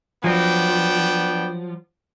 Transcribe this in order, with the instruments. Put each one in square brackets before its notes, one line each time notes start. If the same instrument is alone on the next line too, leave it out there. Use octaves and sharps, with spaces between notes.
[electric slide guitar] F3 F#3 [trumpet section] B3 D4 G5